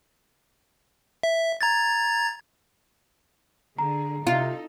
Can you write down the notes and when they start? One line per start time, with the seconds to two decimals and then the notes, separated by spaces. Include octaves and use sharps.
1.23 E5
1.61 A#5 G#6 A6
3.78 D3 G#4 A#5
4.27 C3 D#4 F4 A4